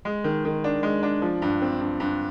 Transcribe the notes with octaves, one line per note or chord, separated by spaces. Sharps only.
G#3
D#3
D#3
D4
G#3
D4
F3
G2
C4
G2
G2